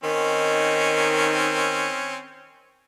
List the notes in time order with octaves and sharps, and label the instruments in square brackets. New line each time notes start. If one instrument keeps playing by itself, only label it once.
[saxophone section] D#3 [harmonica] C4 C#4